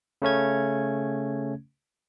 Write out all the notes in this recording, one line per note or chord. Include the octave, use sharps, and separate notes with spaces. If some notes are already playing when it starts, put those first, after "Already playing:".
C#3 A3 C#4 G#6